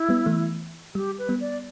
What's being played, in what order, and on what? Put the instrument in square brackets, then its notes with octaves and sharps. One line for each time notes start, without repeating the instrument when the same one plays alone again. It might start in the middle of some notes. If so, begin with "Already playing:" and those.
Already playing: [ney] E4
[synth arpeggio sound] G3 B3
E3 A3
[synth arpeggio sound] G3 [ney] G4
[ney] B4
[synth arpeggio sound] G3 B3
[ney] D5